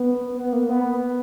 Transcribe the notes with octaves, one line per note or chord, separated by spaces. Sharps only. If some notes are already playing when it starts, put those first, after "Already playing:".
Already playing: B3
B3
A#3
B3